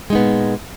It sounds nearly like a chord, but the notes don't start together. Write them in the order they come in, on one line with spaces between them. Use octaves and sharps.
G#3 D#4 B3 A#2